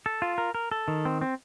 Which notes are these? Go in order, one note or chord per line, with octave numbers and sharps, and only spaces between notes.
A4
F4
A#4
A#4
A4
D#3
C4
C4